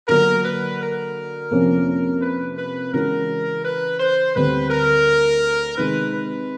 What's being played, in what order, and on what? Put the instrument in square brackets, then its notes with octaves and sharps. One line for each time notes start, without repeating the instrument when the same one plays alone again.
[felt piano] D3 F#3 A#3 [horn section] A#4
[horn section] B4
A#4
[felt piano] F2 C3 F3 A#3 C#4
[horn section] B4
B4
[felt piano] C#3 E3 G#3 C#4 F#4 [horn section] A#4
[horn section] B4
C5
[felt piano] D2 D3 G3 C4 [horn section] B4
[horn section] A#4
[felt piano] C3 D#3 G#3 [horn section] B4
[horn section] B4